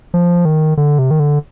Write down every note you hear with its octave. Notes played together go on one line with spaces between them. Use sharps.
F3
D#3
D3
C3
D#3
D3